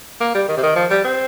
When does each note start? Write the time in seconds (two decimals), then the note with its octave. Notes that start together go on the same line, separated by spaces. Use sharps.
0.21 A#3
0.35 G3
0.48 D#3
0.57 C3
0.63 D#3
0.76 F3
0.90 G3
1.05 C4